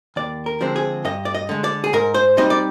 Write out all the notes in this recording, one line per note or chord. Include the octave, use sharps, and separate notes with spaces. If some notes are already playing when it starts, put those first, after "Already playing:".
D#2 D5
A#4
D3 F3 G#3 C4
G#4
G2 D#5
D5
D#5
D3 G#3
D5
G#4
G#2 A#4
C5
G3 C4 D#4 D#5
D5